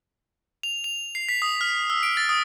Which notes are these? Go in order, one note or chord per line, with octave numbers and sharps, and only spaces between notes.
F7
F7
C7
B6
D#6
F6
E6
D7
A6
D#6